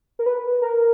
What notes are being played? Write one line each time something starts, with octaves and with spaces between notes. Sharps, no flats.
A#4
B4
A#4